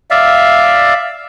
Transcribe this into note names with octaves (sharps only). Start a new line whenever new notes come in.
D5 E5 F5